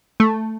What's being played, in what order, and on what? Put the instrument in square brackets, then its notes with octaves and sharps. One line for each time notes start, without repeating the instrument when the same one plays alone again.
[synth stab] A3